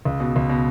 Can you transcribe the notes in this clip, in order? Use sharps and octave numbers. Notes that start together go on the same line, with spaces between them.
C#2
B2
C#2
B2